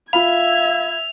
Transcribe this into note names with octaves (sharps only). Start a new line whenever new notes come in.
F4 E5 F5 B5 G#6 F7